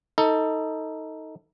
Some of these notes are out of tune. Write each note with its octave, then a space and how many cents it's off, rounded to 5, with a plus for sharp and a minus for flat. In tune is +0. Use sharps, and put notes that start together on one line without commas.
D#4 +20 A4 +20